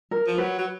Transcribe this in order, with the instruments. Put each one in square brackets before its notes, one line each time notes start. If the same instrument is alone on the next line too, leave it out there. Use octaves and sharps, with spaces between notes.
[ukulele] A#4
[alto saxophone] F3
[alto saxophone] F#3 [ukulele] B4
[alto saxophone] F#3